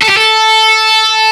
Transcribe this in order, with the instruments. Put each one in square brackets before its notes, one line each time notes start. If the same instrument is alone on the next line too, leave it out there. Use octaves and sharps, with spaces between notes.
[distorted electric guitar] A4
G4
A4